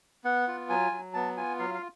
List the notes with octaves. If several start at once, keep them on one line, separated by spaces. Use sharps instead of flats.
B3 F#5
F4
F#3 G#5
F#3
B3 A5
F4 G#5
F#3 F5
F5